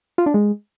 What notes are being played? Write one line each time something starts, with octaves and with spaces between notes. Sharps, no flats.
F4
D4
G#3